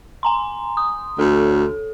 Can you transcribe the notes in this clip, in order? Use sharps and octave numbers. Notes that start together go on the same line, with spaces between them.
G#5 A#5 C6
D#6
D2 A4